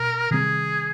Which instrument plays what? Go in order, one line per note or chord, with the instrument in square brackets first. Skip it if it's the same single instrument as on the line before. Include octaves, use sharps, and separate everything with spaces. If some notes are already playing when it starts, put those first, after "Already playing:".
Already playing: [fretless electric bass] B2 [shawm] A#4
[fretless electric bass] C3 D#3 G3 C4 [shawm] G#4